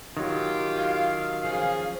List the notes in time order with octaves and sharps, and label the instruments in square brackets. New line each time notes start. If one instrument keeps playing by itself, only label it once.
[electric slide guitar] D#3 F#3 [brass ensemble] F4 G4
[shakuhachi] F5
[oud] C#3 F3 [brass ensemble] G#4